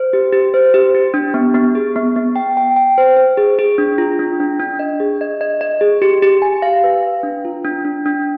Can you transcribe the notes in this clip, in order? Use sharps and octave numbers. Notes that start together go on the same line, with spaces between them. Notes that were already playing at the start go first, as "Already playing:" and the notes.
Already playing: C5
G4
G4
C5
G4
G4
D4
B3
B3
G#4
B3
B3
G5
G5
G5
C5
C5
G#4
G#4
D4
F4
D4
D4
D4
D#5
G#4
D#5
D#5
D#5
G#4
G4
G4
G#5
F5
B4
F5
D4
F4
D4
D4
D4